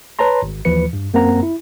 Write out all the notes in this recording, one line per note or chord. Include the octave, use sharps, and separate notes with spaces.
B4 C#5 A5 A#5 C6
G#1
D#2 E3 F3 B4 C#7
G2
F#2 A#3 C4 A#4 F#5 A#5
E4